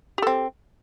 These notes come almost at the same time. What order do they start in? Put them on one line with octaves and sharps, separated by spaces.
G4 A4 C4